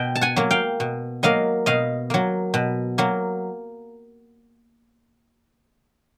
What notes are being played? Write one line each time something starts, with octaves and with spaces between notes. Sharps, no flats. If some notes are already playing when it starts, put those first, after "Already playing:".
Already playing: B2 G5
A5
F#5 G#5
F#3 A#3
F5 G5
B2
F#3 A#3 D#5 F5
B2 D#5 F5
F#3 A#3
B2
F#3 A#3